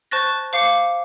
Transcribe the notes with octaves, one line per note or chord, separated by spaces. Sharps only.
C5 A5 C#6 F#6 A6 A#6
C5 F5 D6 C7 C#7